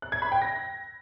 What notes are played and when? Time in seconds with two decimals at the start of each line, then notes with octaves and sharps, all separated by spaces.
0.02 F#6
0.12 G#6
0.22 B5
0.32 G5
0.42 A#6